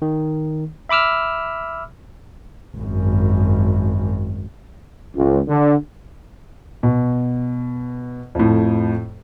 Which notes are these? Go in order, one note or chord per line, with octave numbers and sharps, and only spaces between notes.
D#3
E5 B5 D6 E6 F6
G#1 F#2
C#2
D3
B2
F2 A2